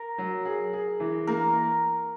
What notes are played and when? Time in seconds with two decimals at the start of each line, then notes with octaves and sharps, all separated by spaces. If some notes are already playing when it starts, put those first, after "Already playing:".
Already playing: A#4
0.18 F#3
0.45 G#4
0.73 G#4
1.00 E3
1.27 A#3 A#4